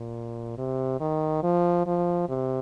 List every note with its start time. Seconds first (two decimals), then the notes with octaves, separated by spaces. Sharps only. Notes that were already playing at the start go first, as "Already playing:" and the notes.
Already playing: A#2
0.58 C3
1.00 D#3
1.43 F3
1.86 F3
2.29 C3